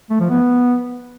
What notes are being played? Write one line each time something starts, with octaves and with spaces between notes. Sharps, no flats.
A3
F3
B3